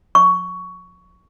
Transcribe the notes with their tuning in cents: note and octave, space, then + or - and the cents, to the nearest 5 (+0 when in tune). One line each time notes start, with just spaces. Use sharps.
C#6 +15